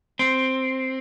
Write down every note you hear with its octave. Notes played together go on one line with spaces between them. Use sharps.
C4